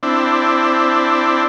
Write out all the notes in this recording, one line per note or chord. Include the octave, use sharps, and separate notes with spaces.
C4 D4 E4